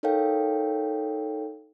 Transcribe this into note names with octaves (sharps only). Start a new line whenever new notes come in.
D#4 A4 A#4 C#5 F5 G5